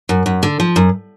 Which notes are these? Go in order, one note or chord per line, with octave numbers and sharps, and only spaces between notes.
F#2
F#2
D3
F3
F#2